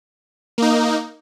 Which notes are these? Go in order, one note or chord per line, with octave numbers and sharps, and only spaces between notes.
A#3 D#4